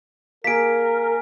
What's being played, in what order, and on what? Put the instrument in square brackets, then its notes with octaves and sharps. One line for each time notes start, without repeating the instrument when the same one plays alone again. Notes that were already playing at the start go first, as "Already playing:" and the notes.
[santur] A#3 G#4 [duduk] A#4 [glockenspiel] B6 D7